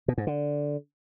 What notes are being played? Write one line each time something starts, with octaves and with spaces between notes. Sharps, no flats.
B2
G#2
D3